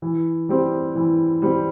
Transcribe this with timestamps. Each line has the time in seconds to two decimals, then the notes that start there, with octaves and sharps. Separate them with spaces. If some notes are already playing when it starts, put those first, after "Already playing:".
0.02 E3
0.49 G3 C4 G4
0.95 E3
1.42 G3 C4 G4